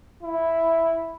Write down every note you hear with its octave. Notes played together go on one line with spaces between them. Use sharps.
E4